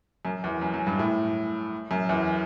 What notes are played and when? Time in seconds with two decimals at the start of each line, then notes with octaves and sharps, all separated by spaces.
0.25 F#2
0.44 E2
0.62 F#2
0.74 F#2
0.87 G2
0.99 A2
1.91 F#2
2.09 E2